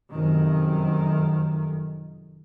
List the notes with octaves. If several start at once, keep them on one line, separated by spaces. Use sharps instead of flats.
F1 F#2 D#3